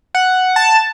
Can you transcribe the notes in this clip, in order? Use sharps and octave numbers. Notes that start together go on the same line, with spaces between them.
F#5
A5